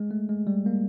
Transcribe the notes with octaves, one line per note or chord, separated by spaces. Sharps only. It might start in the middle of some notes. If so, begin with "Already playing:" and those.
Already playing: G#3
A3
G#3
G3
A#3